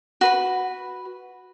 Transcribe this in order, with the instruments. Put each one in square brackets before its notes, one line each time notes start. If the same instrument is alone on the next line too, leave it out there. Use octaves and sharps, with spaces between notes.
[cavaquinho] F#4 B4 B5